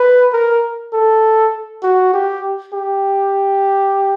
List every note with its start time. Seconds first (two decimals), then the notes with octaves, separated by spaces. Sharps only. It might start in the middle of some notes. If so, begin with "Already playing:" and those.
Already playing: B4
0.33 A#4
0.93 A4
1.83 F#4
2.13 G4
2.73 G4